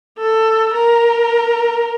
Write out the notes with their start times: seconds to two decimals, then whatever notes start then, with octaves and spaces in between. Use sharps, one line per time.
0.18 A4
0.73 A#4